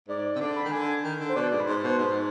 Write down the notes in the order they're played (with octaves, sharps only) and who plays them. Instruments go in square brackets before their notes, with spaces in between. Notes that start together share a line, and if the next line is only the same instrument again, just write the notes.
[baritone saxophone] G#2 [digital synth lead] D5
[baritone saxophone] C3
[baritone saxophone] D3 [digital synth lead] D5
[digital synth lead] B5
[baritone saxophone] D#3
[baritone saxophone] D3 [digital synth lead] G#5
[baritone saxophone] D#3
D3
[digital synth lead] C5
[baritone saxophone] B2 [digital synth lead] D5
[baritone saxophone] G#2 [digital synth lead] D5
[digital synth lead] B4
[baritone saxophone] G#2 [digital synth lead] C5
[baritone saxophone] B2 [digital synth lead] C5
[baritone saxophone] G#2